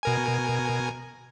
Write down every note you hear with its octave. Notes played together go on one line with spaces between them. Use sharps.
B2 A#4 G#5